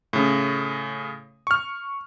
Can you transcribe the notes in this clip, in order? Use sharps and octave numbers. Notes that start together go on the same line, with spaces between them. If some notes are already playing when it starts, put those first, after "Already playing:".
A2 C#3
C#6 F6